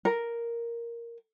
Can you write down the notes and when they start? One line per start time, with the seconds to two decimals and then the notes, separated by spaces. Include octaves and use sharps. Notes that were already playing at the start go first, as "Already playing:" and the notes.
0.05 A#4